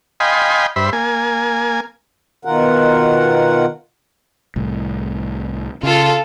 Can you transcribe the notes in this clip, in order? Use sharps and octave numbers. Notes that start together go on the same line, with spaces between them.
D#5 F5 G5 G#5 B5 C6
G2 C5 E5 B5
A#3 G#5
B2 D#3 F4 A#4 F#5
C2 A2
C#3 F4 A4